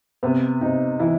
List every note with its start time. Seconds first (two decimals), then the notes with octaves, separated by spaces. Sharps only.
0.23 C3 B3
0.61 C3 D#4
0.99 E3 E4